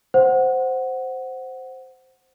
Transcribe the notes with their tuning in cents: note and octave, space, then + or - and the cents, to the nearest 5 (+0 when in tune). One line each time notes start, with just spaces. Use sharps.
C5 +0 F#5 +0